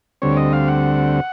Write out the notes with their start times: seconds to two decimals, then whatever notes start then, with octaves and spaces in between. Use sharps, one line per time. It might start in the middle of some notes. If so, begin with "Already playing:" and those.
0.22 D2 D3 G3 C4 C#5
0.37 D#5
0.53 F5
0.68 F#5